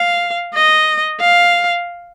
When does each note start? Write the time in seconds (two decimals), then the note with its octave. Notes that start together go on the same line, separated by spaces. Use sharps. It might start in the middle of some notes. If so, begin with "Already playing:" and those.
Already playing: F5
0.54 D#5
1.21 F5